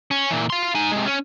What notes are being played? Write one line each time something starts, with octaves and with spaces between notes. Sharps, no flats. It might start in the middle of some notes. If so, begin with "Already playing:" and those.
C#4
A#2 E3
F5 C6
D#4 G#5
C3 G#3
C#4